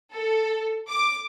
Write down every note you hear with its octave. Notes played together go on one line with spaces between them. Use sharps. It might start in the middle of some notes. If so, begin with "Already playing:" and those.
A4
D6